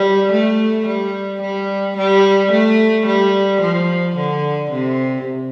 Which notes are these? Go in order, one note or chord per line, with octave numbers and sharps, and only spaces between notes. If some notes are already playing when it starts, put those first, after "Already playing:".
Already playing: G3
A3
G3
G3
G3
A3
G3
F3
D3
C3